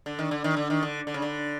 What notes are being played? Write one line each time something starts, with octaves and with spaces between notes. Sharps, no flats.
D3
D#3
D3
D#3
D3
D#3
D3
D3
C#3
D3